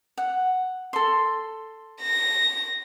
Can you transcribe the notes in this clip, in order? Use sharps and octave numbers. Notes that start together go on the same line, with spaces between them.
F#5
A4 C6
A#6